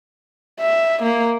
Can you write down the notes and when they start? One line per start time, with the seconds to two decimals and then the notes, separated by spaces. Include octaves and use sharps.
0.61 E5
1.03 A#3